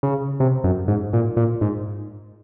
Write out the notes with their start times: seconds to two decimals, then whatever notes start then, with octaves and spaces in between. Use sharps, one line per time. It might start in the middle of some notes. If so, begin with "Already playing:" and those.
0.03 C#3
0.40 C3
0.64 F#2
0.88 G#2
1.13 A#2
1.37 A#2
1.61 G#2